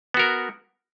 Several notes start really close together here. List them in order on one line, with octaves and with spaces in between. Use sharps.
B3 F#4 A#4